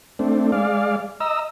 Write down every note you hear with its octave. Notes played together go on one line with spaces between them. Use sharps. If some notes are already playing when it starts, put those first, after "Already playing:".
A3 C4 D4
G#3 D5 F5
D#5 A#5 E6